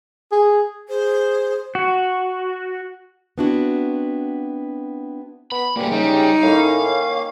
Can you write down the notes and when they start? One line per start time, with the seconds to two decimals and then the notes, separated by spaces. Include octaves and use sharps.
0.32 G#4
0.89 G#4 C5
1.75 F#4
3.38 B3 C4 D4 E4 F#4
5.52 B3 B5
5.76 D2 A#2 G3 G#3 A#3 G4
5.92 C#3 G3 D#4
6.43 A2 D#3 A#3 C#4 F5